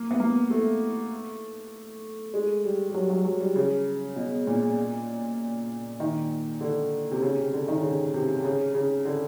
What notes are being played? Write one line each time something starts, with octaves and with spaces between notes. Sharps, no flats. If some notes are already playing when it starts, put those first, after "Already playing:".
Already playing: A#3
B3
A#3
A3
G#3
G3
G3
F#3
F#3
F#3
G3
C#3
B2
A#2
D#3
D3
C3
C#3
C3
D3
D#3
C#3
C3
C#3
C#3
D3